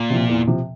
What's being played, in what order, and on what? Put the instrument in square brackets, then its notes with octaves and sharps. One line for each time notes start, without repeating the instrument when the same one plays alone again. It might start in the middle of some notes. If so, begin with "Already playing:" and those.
Already playing: [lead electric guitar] A#2
[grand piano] C3 F3
E2
C3 F3